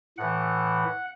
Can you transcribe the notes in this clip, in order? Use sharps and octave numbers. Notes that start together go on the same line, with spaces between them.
A2 E3 F#5